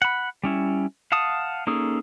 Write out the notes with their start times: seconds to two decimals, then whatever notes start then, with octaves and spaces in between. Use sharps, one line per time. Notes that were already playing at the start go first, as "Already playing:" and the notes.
0.02 F#5 B5
0.43 G3 C#4 E4
1.12 F5 F#5 A5 D#6
1.67 A#3 C#4 D#4 G#4 A4